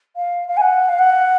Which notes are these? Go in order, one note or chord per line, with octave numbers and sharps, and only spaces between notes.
F5
F5
G#5
F#5
F5
F#5